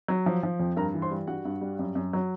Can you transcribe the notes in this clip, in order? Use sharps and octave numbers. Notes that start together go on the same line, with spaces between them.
F#3
F3
F3
F2
G2 A#4 A#5
E3
C5 C6
G3
G2 F#4 F#5
G2
G3
F#2
F#2
F#3